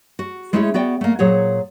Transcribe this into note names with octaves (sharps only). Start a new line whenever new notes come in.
F#4
G#3 A3 C#4 E4 F#4 G#4
B3 F#4 D5 G5
A3 A#3
A#2 F#3 G#4 C5 C#5 F#5